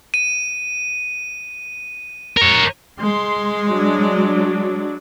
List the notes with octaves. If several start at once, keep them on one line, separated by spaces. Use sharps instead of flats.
D#7
A#4 C#5
G#3 C6
F#3 D4